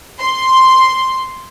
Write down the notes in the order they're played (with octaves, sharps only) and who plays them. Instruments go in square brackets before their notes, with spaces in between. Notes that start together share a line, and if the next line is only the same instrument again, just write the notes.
[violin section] C6